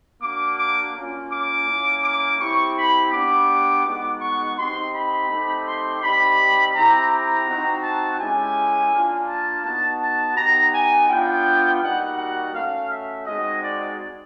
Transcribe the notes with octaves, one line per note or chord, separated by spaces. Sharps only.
A#3 D4 F#4 D6
D6
A#3 C#4 F4
D6
A#3 C#4 E4
D6
C4 E4 G4 C#6
B5
B3 D4 G4 D6
G#3 B3 D#4 F#4
C#6
C4 D#4 G4 C6
B5
A3 C4 D#4 G4
C6
G3 C4 D#4 G4 B5
C4 E4 G4 A#5
A#5
C4 D#4 F#4
A5
G#3 C#4 E4 G4 G#5
A#3 D4 F4
A5
B3 D#4 F#4 A5
A5
B3 D#4 G4 A#5
G#5
B3 D4 F4 G5
G3 A#3 D#4 F#4 F#5
F#5
A3 C#4 F#4 F5
E5
G#3 C4 D#4 F#4 D#5
D5